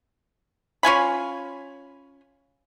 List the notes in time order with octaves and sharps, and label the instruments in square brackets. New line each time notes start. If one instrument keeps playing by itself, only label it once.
[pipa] C#4 F4 G#5 B5